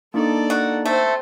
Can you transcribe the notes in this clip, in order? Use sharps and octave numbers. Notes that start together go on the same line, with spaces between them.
A#3 D4 D#4 A4 D5
F#4
A3 C4 C5